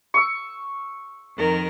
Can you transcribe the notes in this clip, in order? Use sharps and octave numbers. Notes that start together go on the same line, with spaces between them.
C#6 E6
F2 D#3 A#4